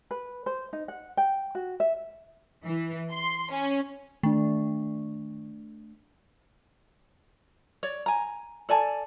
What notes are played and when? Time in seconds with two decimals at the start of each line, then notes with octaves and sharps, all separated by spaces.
0.11 B4
0.46 C5
0.73 D#4
0.88 F#5
1.17 G5
1.55 F#4
1.80 E5
2.64 E3
3.11 C6
3.52 C#4
4.23 D#3 A3 D4
7.83 C#5 D5
8.06 G#5 A#5
8.69 A4 D5 G#5 A5